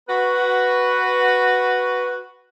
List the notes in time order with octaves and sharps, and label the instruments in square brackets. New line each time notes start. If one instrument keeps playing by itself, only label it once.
[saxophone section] F#4 B4